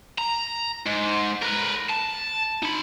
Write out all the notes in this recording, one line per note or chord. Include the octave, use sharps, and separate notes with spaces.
A#5
G#2
A#4 B4
A5
D#4 B5